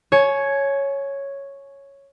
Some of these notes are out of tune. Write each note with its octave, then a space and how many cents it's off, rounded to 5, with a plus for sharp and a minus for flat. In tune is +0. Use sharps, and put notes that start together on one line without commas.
C#5 +0 G#5 +35